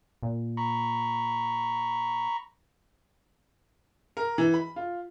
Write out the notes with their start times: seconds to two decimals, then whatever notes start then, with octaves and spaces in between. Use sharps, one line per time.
0.23 A#2
0.57 A#5 B5 C#6
4.17 A#4
4.38 E3
4.54 B5
4.76 F4